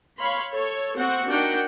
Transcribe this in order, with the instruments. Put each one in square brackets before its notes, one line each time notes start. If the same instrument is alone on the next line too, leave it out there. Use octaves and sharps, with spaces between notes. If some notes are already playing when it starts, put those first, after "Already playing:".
[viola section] C#5 F5 B5 C6
A4 C#5
C4 F#4 F#5
D4 D#4 F#4 A#4 F#5 G5